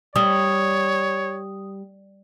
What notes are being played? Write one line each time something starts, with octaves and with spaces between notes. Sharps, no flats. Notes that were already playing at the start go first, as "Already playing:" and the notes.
G3 C#5 D#6